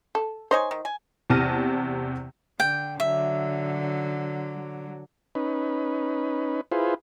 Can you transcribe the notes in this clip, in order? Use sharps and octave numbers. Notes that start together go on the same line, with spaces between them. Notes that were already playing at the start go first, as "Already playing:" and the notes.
A4
D#4 C5 C#5 D#5 G#5
D#3
G#5
E2 C3 A5 F6 A#6 D#7
D3 G5
D3 F#3 E5
C#4 D#4 B4
E4 F4 G#4 B4 C5